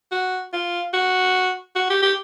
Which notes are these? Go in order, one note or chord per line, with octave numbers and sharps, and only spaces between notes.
F#4
F4
F#4
F#4
G4
G4